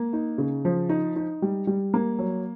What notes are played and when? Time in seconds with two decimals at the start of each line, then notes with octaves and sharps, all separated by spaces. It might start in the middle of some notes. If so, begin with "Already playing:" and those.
Already playing: A#3
0.13 D#4
0.38 C#3
0.65 F3
0.89 D#4
1.16 D#4
1.42 G3
1.67 G3
1.94 A#3
2.19 F#3